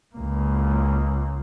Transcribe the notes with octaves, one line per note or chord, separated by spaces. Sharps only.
C#2 A#3